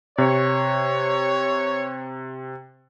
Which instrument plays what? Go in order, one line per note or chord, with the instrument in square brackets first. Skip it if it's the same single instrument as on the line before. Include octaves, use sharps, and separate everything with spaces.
[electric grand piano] C3 [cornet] C#5